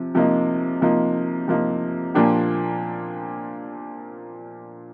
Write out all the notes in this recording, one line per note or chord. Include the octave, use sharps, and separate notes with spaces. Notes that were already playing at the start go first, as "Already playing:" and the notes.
Already playing: C3 F3
C3 F3 A#3 D#4
C3 F3 A#3 D#4
C3 F3 A#3 D#4
A#2 F3 A#3 D4 G4